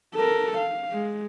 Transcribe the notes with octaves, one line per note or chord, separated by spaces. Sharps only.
A4 A#4
F5
G#3